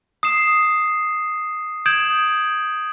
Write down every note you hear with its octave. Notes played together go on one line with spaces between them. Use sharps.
D#6 C7 E7
D#6 G6 G#6 D7 E7 F#7